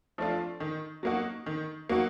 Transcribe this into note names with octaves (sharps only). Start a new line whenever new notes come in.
F3 A3 D4 F4
D#3
F#3 A#3 D#4 F#4
D#3
F#3 A#3 D#4 F#4